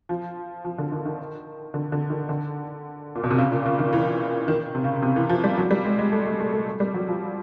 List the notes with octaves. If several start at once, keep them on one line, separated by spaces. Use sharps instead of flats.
F3
F3
D3
D#3
D#3
D3
D3
D#3
D3
A#2
B2
C3
C#3
A#2
C#3
D#3
E3
D#3
C3
C#3
C3
E3
F3
G3
F#3
G3
G#3
G#3
A3
A3
A3
A3
G3
F#3
F3